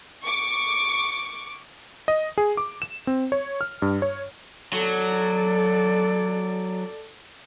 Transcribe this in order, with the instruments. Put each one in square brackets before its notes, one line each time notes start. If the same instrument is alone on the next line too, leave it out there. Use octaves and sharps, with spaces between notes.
[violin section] C#6 D6
[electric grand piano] D#5
G#4
D6
E7
C4
C#5
F6
G2
C#5
[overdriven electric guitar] F#3 [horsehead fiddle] A4 D5